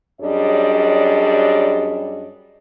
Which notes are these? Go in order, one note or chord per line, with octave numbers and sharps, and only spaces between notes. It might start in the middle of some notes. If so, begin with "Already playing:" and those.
F#2 G3 D4 G#4 C#5 D#5